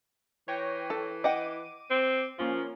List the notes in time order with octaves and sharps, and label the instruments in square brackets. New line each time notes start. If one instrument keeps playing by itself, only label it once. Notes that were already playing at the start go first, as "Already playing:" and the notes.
[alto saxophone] E3 [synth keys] C#5 G5 A#6
[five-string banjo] A4
[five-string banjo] D#5 F#5 G5 [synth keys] D6 D#7
[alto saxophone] C4
[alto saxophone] F3 [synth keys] A#3 C#4 F4